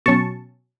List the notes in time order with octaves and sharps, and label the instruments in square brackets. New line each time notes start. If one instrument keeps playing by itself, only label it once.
[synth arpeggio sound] B2 F#3 C#4 A5 C#6